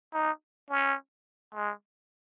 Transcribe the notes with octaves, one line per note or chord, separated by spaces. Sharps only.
D#4
C#4
G#3